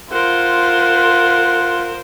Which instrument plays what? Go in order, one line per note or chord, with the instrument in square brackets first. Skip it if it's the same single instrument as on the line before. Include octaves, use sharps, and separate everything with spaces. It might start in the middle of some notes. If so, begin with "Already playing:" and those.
[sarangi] F4 [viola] A#4 C5 [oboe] F#5